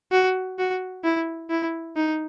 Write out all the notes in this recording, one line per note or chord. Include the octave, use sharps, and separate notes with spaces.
F#4
F#4
E4
E4
D#4